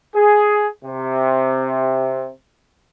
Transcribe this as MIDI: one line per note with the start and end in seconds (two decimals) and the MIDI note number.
0.15 0.67 68
0.85 2.27 48